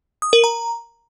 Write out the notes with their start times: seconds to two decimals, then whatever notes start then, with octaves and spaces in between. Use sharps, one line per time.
0.22 D#6
0.33 A#4
0.44 A#5